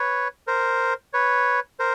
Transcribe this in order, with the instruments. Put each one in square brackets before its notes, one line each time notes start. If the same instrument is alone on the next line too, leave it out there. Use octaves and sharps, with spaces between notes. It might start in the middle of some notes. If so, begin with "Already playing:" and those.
Already playing: [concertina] B4 C#5
A#4 C5
B4 C#5
A#4 C5